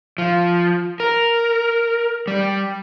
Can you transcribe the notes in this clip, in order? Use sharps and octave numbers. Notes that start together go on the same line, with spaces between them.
F3
A#4
G3